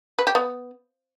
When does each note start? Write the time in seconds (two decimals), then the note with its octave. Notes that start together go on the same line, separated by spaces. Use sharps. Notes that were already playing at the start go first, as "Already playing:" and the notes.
0.19 B4
0.27 G4
0.35 B3